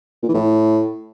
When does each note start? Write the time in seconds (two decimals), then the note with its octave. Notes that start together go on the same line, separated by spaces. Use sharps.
0.23 A#2
0.29 E3
0.34 A2